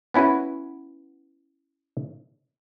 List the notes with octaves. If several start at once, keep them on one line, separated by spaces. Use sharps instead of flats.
B3 C#4 E4 F#4 B4